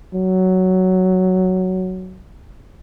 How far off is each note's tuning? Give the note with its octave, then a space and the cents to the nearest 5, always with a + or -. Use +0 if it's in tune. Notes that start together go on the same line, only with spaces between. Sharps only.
F#3 +5